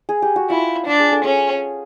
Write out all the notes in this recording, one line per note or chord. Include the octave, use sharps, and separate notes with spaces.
G#4
G4
F#4
E4 F4
D4 F4
G#4
A4
C#4 G#4